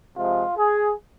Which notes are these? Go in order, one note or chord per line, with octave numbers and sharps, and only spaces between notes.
C3 F3 G#3 F4
G#4